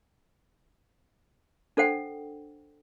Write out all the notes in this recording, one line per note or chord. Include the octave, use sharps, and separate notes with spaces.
D4 A4 C5 F#5 G5